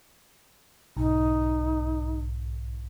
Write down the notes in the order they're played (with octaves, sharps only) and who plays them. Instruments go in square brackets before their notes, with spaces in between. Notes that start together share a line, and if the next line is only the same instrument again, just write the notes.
[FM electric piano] B1 G#2 [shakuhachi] D#4